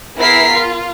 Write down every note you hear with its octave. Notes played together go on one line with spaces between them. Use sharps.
B3 E4 G#4 A#4 B6 C7
F4